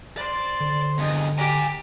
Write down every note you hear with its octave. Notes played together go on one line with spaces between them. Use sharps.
C5 D5
D3
E2 G2 D#5
G4 G#5 A#5